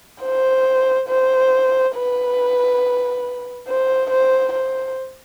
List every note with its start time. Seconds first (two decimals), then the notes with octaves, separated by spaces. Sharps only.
0.22 C5
1.09 C5
1.96 B4
3.68 C5
4.11 C5
4.53 C5